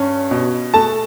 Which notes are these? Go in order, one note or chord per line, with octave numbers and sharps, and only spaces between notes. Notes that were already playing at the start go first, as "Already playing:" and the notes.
Already playing: G2 C#4
B2
A3 A5